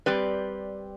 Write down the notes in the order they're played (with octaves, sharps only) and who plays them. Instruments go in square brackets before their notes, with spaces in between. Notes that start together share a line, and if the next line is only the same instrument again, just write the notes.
[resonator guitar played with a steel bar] G3 C4 G4 B4 D5